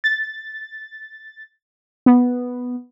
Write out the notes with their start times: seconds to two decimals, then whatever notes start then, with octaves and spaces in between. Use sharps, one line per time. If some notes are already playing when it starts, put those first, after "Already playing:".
0.04 A6
2.06 B3